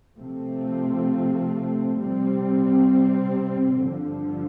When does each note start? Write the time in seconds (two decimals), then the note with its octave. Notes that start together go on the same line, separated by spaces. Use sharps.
0.17 C3 F3 A3 C4
1.98 C3 G3 C4
3.80 G2 D3 F3